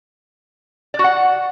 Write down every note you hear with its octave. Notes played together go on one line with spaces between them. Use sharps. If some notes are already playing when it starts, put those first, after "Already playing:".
D5
F#4
F#5